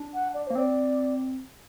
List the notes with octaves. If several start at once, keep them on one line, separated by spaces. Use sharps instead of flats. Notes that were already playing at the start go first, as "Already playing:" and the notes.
Already playing: D4
F#5
D5
A#3 C5
C4 D5